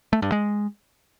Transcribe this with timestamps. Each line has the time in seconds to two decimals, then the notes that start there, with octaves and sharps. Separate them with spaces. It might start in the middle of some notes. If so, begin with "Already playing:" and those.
0.13 A3
0.22 G2
0.32 G#3